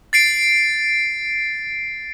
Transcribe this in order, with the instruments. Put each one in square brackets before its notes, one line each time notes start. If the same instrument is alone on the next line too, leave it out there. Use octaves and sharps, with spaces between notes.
[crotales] A6 C7 D7